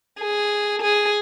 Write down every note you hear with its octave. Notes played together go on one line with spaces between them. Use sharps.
G#4
G#4